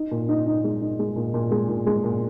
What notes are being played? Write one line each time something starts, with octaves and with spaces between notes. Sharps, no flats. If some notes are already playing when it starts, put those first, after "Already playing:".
Already playing: D#4
A#2
D#4
D#4
G#3
D#4
G#3
A#2
A#2
G#3
A#2
G#3
A#2